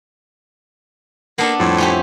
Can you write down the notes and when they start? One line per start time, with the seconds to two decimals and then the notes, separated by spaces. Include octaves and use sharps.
1.38 A#3 B3 D4 A4
1.59 F2 A2
1.78 C#4 E4 G4